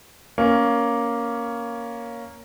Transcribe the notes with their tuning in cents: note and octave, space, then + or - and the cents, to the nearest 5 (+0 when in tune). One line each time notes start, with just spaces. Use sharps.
A#3 +5 C#4 +10